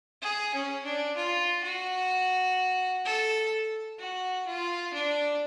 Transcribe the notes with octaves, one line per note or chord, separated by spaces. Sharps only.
G#4
C#4
D4
F4
F#4
A4
F#4
F4
D4